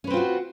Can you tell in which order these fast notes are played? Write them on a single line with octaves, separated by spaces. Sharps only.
C#4 B4 C4 F4 F#4